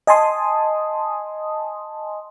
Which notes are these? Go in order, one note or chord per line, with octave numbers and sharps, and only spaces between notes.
D#5 G#5 A5 C6 D#6